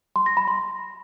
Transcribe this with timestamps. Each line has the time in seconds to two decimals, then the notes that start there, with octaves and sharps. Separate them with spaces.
0.16 C6
0.26 A#6
0.37 B5
0.48 C6